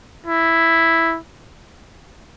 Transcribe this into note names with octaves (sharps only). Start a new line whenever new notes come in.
E4